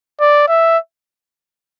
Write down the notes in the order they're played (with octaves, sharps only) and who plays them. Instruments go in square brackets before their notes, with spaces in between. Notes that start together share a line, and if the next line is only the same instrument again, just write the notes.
[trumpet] D5
E5